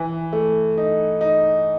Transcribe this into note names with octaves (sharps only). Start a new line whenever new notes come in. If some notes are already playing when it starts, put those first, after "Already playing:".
Already playing: E3
A3
D#4
D#4